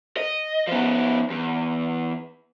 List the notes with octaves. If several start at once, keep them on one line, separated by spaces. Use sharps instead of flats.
D#5
F3 B3
E2